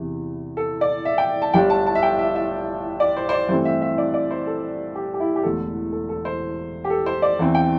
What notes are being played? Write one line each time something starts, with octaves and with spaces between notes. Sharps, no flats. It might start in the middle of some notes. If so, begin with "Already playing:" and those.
Already playing: E2 C3 E3
A4
D5
E5
G5
A5
G1 G2 G3 D4 G5
A5
A5
E5
G5
E5
E5
D5
C5
C5
D5
G2 E3 A3 C4 C5
E5
E5
D5
D5
C5
A4
G4
G4
E4
G4
E1 E2 D3 A3 A4
A4
A4
C5
G4
A4
C5
D5
E2 E3 C4
G5